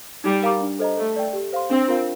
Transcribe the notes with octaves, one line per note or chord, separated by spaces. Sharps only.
G3 D#4
A#4 F5 A#5 D6
D4
A4 C5 D#5 A#5
A3 A4
D5 G5
G4
C5 F5 C6
C4 D4
F4 A#4 F5